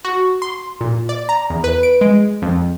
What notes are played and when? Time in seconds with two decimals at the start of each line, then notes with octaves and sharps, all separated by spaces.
0.05 F#4
0.42 C6
0.81 A#2
1.09 D5
1.29 A#5
1.50 E2
1.64 B4
1.83 D7
2.01 G#3
2.42 F2